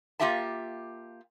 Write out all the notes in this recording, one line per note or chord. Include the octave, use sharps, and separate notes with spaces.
A#3 C4 F4 G4 E5 A5